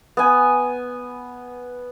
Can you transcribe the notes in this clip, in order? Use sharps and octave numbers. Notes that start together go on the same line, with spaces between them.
B3 G#5